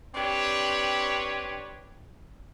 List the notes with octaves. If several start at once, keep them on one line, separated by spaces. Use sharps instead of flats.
C4 D4 G4 B4 C#5